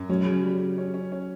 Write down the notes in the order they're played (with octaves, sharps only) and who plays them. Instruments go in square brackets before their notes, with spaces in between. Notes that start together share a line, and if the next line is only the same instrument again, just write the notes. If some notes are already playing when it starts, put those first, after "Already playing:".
Already playing: [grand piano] F#2
[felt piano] F#3 [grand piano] C#4
[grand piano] C#3
G3
C#3
C#4
C#4
C#4